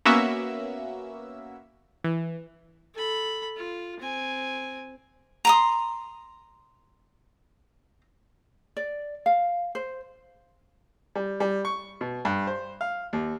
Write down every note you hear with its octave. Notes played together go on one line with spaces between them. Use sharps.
A#3 B3 C#4 F#4 E5 E6
E3
A4 B5
F4
C4 G#5
A#5 C6 D#6
D5
F5
C5
G3
G3
C#6
B2
G2
C5
F5
D#2